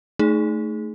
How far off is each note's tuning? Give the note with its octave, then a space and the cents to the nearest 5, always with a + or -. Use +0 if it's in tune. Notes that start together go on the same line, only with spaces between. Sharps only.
A3 +0 D#4 +0 G#4 +15